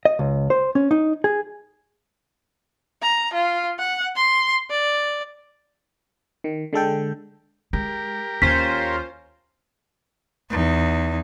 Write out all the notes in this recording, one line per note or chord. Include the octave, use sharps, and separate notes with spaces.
D#5
C#2
C5
C#4
D#4
G#4
A#5
F4
F#5
C6
D5
D#3
D3 G#3 A4 G5
G#3 G4 A#4
D#2 C#4 F4 C5 B6
E2 D#4